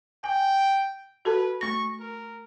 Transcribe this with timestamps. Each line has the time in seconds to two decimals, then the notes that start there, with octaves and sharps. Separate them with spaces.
0.24 G5 G#5
1.25 F#4 A4 B4 A5
1.61 A3 C#6 A#6
1.99 A#4